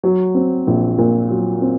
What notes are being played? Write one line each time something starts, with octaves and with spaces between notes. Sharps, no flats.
F#3
C4
A#1
A#2
F#3
C4